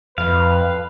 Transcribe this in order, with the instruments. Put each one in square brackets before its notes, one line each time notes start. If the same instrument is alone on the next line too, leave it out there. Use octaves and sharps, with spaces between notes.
[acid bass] F2 [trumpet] B4 [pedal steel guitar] F5